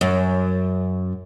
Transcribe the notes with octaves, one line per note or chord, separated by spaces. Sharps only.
F#2